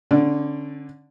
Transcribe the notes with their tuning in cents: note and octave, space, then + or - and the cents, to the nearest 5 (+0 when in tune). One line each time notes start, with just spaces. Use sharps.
D3 +0 C#4 -30 D5 +0